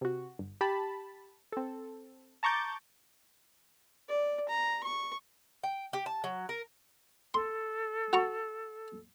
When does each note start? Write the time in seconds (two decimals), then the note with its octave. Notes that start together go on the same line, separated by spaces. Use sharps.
0.01 C3 F#4
0.39 G1
0.61 G4 A5 B5
1.52 C4 A4
2.43 A5 A#5 C#6 D6 G6 A6
4.08 D5
4.49 A#5
4.84 C#6
5.63 G5
5.93 G4
6.06 A5
6.24 F#3
6.49 A#4
7.34 A4 C6
8.13 F#4 A#5 C#6